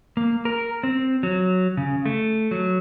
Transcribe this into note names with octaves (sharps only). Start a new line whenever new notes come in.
A#3
A#4
C4
F#3
C#3
A3
F#3